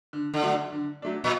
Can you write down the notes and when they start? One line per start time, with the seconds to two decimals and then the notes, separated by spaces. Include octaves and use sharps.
0.13 D3
0.34 D3
0.43 F#3 A3 D4
0.72 D3
1.02 F#3 A3 D4
1.24 A#2